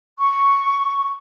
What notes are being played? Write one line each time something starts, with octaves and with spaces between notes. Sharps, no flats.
C#6